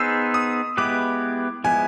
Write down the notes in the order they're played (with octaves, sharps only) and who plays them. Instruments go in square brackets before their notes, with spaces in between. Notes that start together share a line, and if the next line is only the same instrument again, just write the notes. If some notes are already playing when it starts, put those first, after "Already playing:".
Already playing: [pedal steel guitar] B3 D#4 G#4 C5 [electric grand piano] E6
[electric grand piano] D#6
[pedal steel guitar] G#3 B3 E4 G4 B4 [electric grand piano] D6
[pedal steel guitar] F3 G#3 B3 E4 [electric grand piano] G#5